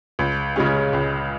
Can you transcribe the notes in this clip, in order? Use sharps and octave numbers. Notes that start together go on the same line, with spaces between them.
C#2
C#3 G#3 C#4
C#2